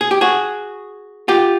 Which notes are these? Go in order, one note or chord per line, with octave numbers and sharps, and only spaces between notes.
G#4
G4
F#4 G#4
F4 G4